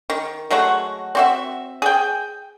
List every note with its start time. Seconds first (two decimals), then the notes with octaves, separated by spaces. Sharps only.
0.10 D#3
0.51 F#3 G#3 A3 F#4
1.15 C4 F#4 E5
1.82 G#4 G5